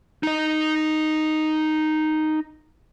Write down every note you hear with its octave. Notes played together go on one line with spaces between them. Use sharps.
D#4 D#5